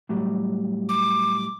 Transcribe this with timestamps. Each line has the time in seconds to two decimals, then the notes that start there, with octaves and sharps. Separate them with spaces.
0.09 A2 F#3 G3
0.89 D6